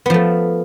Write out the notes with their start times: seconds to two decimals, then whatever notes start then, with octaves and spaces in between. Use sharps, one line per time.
0.06 B3
0.10 F3
0.14 A3